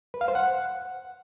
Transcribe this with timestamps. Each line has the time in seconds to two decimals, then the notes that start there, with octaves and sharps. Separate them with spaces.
0.14 B4
0.21 F5
0.28 C5
0.35 F#5